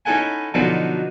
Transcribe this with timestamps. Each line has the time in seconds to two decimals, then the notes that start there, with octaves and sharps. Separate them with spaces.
0.05 C#4 D#4 E4 A4 F#5 G#5
0.54 B2 D3 F3 F#3 B3 D#4